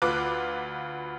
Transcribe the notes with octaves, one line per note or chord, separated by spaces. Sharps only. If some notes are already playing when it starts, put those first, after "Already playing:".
D2 F4 B4 D6 F#6